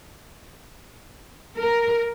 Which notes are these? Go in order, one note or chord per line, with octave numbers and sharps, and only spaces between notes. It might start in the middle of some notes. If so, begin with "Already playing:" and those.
A#4